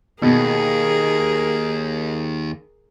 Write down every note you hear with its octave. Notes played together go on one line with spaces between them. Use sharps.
D#2 B2 G#4 A#4